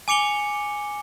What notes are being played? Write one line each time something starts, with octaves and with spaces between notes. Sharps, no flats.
G#5 D6 C#7 F7 G7